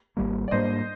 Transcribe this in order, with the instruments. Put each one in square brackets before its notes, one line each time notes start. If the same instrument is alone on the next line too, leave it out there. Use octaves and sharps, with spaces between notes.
[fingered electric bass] G#1 G#2 G3 A#3
[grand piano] D5
[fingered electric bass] G#2 G3 A#3 D4 [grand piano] C5 D#5